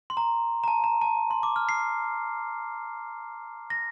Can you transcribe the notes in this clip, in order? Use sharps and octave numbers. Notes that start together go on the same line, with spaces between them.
C6
A#5
A#5
A5
A#5
A5
C6
D6
F6
C7
A#6